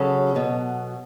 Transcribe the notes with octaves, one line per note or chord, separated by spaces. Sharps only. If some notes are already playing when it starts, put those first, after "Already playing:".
Already playing: C#3 F#3 A4
B2 F#3